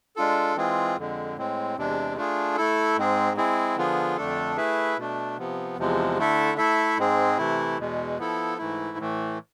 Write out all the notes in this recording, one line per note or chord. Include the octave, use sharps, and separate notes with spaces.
G#3 D4 F4 A4
E3 G#3 C4 F4 G#4
F2 D3 G#3
A2 G#3 C4
E2 C3 G#3 D4
A3 D4 F4 G#4
A3 E4 A4
G#2 G#3 C4 G#4
G#3 C4 E4 G#4
D3 F3 B3 F4 G#4
F2 D3 A3 D4 A4
A3 E4 G#4 B4 E5
B2 A3 D4
C3 F3 B3
E2 C3 F3 G#3
D3 A3 E4 A4 E5
A3 E4 A4 E5
G#2 G#3 C4 G#4
C3 E3 A3 E4
E2 B2 G#3
F3 B3 E4 A4
G#2 E3 A3 E4
A2 E3 A3